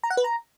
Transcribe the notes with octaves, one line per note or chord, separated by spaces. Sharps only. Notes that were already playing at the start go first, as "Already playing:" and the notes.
A#5
F#5
B4
A#5